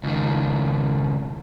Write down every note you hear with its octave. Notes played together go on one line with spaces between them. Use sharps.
C#2 D#3